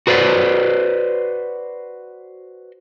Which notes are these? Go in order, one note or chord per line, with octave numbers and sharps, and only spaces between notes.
F#4 B4 C5 D5